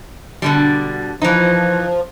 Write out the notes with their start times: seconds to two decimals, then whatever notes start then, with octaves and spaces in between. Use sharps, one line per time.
0.42 B2 D3 G3
1.22 E3 F3 D#4